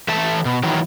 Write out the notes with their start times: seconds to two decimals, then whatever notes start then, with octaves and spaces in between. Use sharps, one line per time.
0.08 E3 A3 E5 A5
0.45 B2
0.63 D#3 E3 F#3